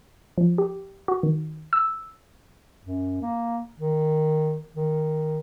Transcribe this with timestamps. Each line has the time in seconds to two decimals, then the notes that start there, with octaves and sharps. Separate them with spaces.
0.38 F3
0.58 G4
1.08 F#4
1.23 D#3
1.73 E6
2.85 F#2
3.22 A#3
3.79 D#3
4.75 D#3